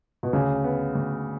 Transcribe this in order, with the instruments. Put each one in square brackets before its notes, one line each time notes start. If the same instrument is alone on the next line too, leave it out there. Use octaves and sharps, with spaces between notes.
[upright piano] B2
[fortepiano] D2 [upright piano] C#3
[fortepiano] B3
D2